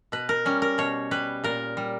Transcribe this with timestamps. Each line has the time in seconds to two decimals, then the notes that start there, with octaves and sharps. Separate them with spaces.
0.12 B2 B4
0.29 A#4
0.45 G3 C#4
0.62 A#4
0.78 B2 C#5
1.11 G3 B4
1.44 A#2 A#4
1.77 G3